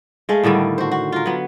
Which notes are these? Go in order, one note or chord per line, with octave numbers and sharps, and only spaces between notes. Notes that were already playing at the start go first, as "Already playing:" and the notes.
G#3 A3 F5
A2 D3 D#3 G3
F#4 C5
F#4
F4 A#4
F#3 B3